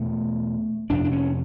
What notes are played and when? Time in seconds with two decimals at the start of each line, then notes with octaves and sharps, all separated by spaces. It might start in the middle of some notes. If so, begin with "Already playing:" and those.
Already playing: E2 B2 A3
0.90 F2 C3 D4
1.05 D4
1.12 C#4